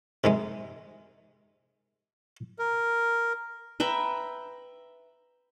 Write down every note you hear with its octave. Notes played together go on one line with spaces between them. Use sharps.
C3 D#3 G#3
A#4
B4 E5 G5 A#5